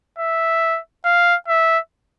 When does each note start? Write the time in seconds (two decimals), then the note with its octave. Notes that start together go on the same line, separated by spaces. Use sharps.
0.19 E5
1.05 F5
1.48 E5